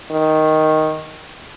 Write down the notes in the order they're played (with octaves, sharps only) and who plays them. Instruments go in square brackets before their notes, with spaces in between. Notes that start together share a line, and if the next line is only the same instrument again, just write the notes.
[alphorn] D#3